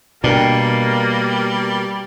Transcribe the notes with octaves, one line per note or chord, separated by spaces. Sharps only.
B2 G3 A#3 D4 A#4 G5